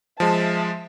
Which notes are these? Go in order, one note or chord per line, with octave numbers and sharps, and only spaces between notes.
F3 G#3 E5 A5